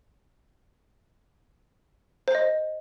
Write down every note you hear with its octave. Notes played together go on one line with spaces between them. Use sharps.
C5
D#5
C5